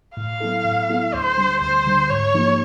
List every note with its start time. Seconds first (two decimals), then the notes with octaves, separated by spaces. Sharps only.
0.17 A2 F5
0.40 F#3 B3 E4 A4
0.64 A2
0.89 F#3 B3 E4 A4
1.14 D2 C5
1.37 D3 G3
1.61 D2 C5
1.86 D3 G3
2.10 G#2 C#5
2.34 F3 A#3 D#4 G4